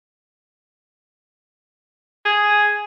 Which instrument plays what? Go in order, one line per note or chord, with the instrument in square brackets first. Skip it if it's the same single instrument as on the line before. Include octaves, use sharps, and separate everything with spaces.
[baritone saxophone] G#4